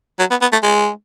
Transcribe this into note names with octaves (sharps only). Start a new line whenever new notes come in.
F#3
B3
B3
A3
G#3